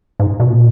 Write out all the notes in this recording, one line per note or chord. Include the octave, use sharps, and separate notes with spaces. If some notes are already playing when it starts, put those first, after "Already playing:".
G#2
B2
A#2